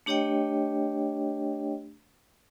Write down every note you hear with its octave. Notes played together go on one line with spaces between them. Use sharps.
A3 D4 G4 C#5 D#5 G5